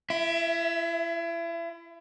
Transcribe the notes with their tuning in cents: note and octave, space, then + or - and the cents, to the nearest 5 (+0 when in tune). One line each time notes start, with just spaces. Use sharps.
E4 +35 E5 +0